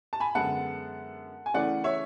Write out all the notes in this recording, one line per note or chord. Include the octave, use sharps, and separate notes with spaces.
A5
G#5 B5
F#2 D3 G#3 B3 F#5 A5
G#5
C#3 E3 A3 D5 F#5
C#5 E5